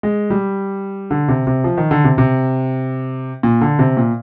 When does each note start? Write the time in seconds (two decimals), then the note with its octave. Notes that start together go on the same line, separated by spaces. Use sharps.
0.03 G#3
0.30 G3
1.11 D3
1.28 C3
1.47 C3
1.64 F3
1.77 D#3
1.91 D3
2.04 C3
2.18 C3
3.43 A#2
3.61 D3
3.79 C3
3.97 A#2